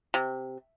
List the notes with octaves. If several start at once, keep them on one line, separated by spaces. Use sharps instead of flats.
C3